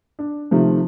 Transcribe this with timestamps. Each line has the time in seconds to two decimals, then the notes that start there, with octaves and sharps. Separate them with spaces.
0.19 D4
0.51 C3 D#3 F3 A3